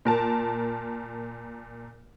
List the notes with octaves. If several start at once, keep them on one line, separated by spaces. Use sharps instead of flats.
A#2 A#4 A5